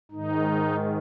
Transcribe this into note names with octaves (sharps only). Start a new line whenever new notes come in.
G#2 D#3 D#4